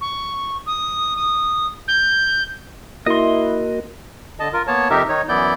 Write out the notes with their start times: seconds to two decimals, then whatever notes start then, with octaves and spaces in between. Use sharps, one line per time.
0.01 C#6
0.66 D#6
1.17 D#6
1.88 G6
3.06 A#3 E4 F#4 A#4 D#5 C6
4.40 D3 D#5 A5
4.53 F4 A#4
4.67 A#3 B3 C#5 A5
4.90 F2 C3 D#4 G4 A#4 E5
5.09 D#3 D#4 C#5
5.29 F#2 E3 B3 E4 D5 G6